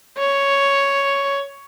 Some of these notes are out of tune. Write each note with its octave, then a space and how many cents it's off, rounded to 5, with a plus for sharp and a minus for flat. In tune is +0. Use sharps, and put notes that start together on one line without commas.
C#5 +5